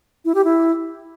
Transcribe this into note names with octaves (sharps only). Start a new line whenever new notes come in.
E4
G4
E4